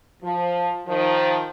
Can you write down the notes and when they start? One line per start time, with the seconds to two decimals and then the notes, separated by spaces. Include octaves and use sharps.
0.23 F3
0.87 D#3 F3